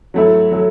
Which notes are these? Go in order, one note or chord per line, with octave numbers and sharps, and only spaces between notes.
F#3 A3 E4
F#3 A3